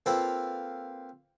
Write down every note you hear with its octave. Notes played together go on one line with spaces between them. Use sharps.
A#3 C4 F4 A4 B4 F5